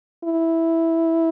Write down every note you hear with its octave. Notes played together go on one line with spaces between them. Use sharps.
E4